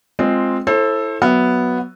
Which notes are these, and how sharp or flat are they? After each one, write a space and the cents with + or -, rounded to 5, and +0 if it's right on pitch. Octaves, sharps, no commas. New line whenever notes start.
G#3 +0 C4 +0 F4 +0
E4 +0 A4 +0 C5 +35
F#3 +0 B3 +0 E5 +0